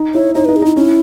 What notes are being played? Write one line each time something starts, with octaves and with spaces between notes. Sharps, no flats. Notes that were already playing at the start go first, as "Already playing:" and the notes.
Already playing: D#4
E4 C#5
D#4 C#5
D#4 B4
G#4
D#4 E4
C#4 E4